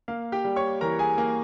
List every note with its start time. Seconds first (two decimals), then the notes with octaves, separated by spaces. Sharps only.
0.08 A#3 F5
0.32 G4 G5
0.44 G3
0.56 C#5 C#6
0.81 E3 A#4 A#5
0.99 G#4 G#5
1.18 A#3